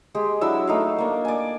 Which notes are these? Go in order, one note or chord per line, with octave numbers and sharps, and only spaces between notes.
G#3 G4 G#4
F#3 D4 E4 E6
A3 D#4 F5
A#3 D4
D5 G#5